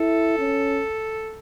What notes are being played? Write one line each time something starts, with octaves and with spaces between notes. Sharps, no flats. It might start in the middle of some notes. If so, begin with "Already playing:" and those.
Already playing: E4 A4
C#4